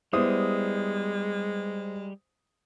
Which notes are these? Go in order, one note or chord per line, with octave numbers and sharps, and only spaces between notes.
G3 G#3 B3 E4 C5 D#6